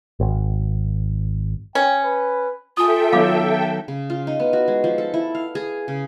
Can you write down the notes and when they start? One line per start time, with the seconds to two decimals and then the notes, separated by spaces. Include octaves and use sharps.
0.20 G#1
1.75 C#4 G5
2.04 B4
2.77 F4 A4 E5 G5 G#5 D#6
3.12 D#3 F#3 B3 F5 B5 D6
3.88 C#3
4.10 F4
4.27 D#4
4.40 B3
4.53 F#4
4.68 G#3
4.84 F3
4.98 A4
5.14 E4
5.35 F5
5.55 G#4
5.88 C#3